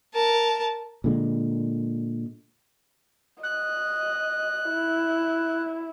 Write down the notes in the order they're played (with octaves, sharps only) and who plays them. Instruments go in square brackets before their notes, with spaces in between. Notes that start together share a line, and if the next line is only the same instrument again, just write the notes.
[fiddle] A#4 A5
[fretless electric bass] A#2 D3 G#3
[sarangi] D#5 [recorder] F#6
[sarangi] E4